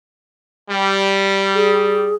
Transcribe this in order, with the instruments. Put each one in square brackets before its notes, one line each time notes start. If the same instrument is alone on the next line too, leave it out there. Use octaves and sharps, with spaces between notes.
[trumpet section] G3
[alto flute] G#4